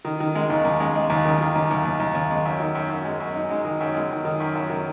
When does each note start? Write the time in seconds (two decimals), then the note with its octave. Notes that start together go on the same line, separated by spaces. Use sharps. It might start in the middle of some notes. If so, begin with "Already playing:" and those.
0.05 D#3
0.20 D#3
0.35 G#3
0.50 D#2
0.65 D#2
0.80 G#3
0.95 G#3
1.10 D#2
1.25 D#3
1.41 D#3
1.56 D#2
1.71 D#2
1.85 D#2
2.00 D#2
2.15 D#2
2.30 G#3
2.45 F#2
2.60 D#3
2.75 F#2
2.90 F#2
3.05 G#3
3.20 F#2
3.36 D#4
3.50 G#3
3.65 D#3
3.80 F#2
3.95 G#3
4.10 D#3
4.25 D#3
4.40 F#2
4.55 F#2
4.70 D#3